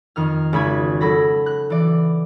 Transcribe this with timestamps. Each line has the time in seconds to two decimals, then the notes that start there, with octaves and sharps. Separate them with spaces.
0.16 F2 D#3 F6
0.53 G#1 C#3 B5 G#6
1.01 F#3 A4 B5 A#6
1.46 F#6
1.70 E3 D5